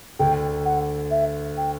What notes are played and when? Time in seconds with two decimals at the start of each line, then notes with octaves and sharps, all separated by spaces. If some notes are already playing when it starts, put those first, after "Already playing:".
0.19 D2 D3 G5
0.65 F#5
1.11 E5
1.57 G5